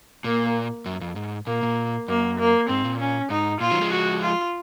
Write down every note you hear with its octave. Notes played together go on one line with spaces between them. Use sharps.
A#2 A#3
F#2
F2
G#2
A#2 A#3
A#2
F#2 A#3
A#3
G#2 C4
A#2
C#4
G#2 D#4
A#2 F4
D#3 F#3
F3 G#3
F#4
F4